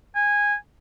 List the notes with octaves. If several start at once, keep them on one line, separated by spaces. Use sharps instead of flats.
G#5